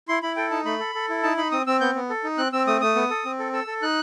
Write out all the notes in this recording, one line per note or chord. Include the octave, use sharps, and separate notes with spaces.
E4 C6
E4 B5
A4 G5
D#4 A5
A3 B5
A4
A4
E4
D#4 A5
D#4 B5
C4 D#6
C4 E6
B3 G6
B3
A4
D#4
C4 F#6
C4 E6
A3 D#6
A3 D#6
B3
A4
C4
A4
A4 E6
A4
D#4 F#6